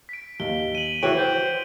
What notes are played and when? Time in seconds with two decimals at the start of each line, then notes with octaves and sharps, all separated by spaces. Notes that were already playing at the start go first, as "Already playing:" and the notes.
0.09 B6 D7
0.40 D#2 G7
0.75 D#7 F#7
1.03 E3 F#4 G4 C#5 D7
1.17 C5